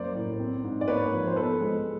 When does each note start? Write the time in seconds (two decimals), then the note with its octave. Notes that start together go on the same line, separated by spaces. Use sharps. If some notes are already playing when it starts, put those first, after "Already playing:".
Already playing: F#2 A#3 C5 D5
0.15 A2
0.39 C4
0.64 G#2
0.81 D5
0.88 A#3 B4 C#5
1.12 F3
1.27 C5
1.36 B3 A4 B4
1.61 G#3